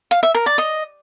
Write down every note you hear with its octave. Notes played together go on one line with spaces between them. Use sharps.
F5
E5
A#4
D5
D#5